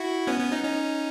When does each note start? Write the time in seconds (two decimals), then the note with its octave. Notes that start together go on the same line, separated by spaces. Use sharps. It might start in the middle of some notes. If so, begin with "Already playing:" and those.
Already playing: E4 F#4
0.27 B3 C#4
0.40 B3 C#4
0.52 C#4 D#4
0.64 C#4 D#4